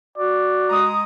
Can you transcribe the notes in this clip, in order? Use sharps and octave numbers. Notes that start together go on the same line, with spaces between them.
F#4 D5
G#3 A#5 D#6